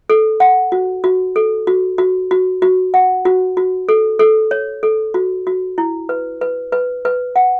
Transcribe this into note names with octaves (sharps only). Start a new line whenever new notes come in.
A4
F#5
F#4
F#4
A4
F#4
F#4
F#4
F#4
F#5
F#4
F#4
A4
A4
C#5
A4
F#4
F#4
E4
B4
B4
B4
B4
F#5